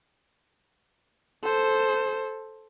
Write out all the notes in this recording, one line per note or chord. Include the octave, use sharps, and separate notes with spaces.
A4 C5